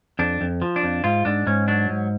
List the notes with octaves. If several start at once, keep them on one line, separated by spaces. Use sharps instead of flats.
F2 D4
F2
F3
D4
F2
G#2 F4
G#2 D4
G#2 C#4
F#3 D4
G#2